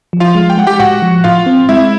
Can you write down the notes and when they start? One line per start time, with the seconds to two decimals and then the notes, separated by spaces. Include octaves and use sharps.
0.13 F3
0.20 F4 F5
0.35 G#3
0.50 G5
0.58 G#3 F#5
0.67 G4 G5
0.79 A2 F#4 F#5
1.02 F3
1.24 A2 F4 F5
1.46 C4
1.69 G#3 E4 E5